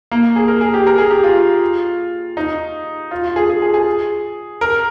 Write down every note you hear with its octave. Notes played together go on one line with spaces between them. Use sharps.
A#3
G#4
A#4
G#4
G4
A#4
G#4
G4
F4
D#4
F4
F4
G#4
G#4
G#4
G#4
A#4